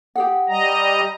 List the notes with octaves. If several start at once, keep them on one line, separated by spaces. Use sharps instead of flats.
G4 G#4 F#5
G3 D#5 A#5